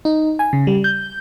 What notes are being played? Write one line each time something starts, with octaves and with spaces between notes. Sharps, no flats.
D#4
G#5
C#3
G3
G6